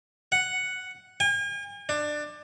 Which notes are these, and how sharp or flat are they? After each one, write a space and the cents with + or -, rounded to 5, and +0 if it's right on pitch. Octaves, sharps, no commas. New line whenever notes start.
F#5 +0
G#5 -45
D4 +20